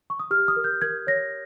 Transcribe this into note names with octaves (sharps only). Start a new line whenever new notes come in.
C#6
D#6
G4 F6
D#6
A#4
G6
A#4 G#6
C#5 A#6